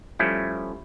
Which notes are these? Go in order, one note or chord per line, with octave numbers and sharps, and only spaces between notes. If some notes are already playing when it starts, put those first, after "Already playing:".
F3 G3 A3 C#4 E4